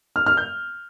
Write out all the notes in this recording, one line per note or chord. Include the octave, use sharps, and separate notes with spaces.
F6
F6
G6